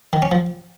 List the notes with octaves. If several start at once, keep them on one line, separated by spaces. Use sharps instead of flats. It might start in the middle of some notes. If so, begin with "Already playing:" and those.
D#3
C#4
F3